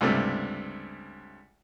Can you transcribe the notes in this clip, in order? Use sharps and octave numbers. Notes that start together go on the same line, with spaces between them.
C#2 G2 C3 A3